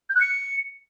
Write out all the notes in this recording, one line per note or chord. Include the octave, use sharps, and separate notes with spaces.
G6
F#6
C#7